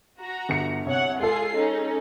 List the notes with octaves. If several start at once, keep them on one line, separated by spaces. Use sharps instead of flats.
F#4 A#5
G1 C#7
C2 C#5 F#5
G#3 F4 G#4 A4 C7
C#4 D#4